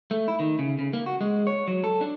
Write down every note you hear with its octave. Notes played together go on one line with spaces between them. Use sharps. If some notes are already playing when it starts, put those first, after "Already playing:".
A3
E4
D#3
C#3
C#3
A#3
F#4
G#3
C#5
F#3
A4
D4